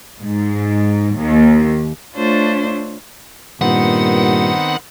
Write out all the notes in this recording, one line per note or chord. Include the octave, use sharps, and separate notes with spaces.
G#2
D#2
A3 D4 F4 C5 C#5
G2 A#2 D#3 B3 C4 F#5